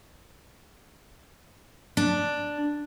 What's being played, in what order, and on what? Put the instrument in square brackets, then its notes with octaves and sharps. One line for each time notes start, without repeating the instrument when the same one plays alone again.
[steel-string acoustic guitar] D4